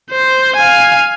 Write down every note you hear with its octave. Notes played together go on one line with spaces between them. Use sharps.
C5
F5 G#5